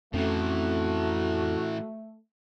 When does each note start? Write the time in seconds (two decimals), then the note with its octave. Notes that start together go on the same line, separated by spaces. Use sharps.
0.14 F2 A2 E3 A3 C4 C#4 F#4